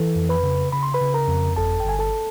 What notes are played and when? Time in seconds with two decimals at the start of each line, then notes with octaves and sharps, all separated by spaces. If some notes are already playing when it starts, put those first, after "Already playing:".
Already playing: E3 A4
0.16 F2
0.29 B4 B5
0.43 C#3
0.72 C#3 B5
0.83 C6
0.94 B4 B5
1.01 C#3
1.14 A#4 A#5
1.28 F2
1.56 G1 A4 A5
1.80 G5
1.86 G1 G#5
1.99 A4 A5